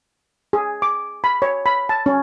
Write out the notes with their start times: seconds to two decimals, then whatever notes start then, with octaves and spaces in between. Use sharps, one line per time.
0.53 G#4
0.82 D6
1.24 B5
1.42 C#5
1.66 B5
1.89 A5
2.06 C#4